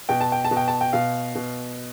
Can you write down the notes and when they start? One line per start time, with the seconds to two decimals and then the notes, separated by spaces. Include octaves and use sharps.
0.09 B2 G5
0.21 A5
0.32 G5
0.45 A5
0.51 B2
0.57 G5
0.68 A5
0.81 G5
0.93 B2 F5
1.35 B2